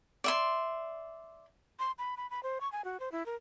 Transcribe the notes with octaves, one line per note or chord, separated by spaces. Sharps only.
D5 E5 C6
C6
B5
B5
B5
C5
C#6
G#5
F#4
C5
E4
A#4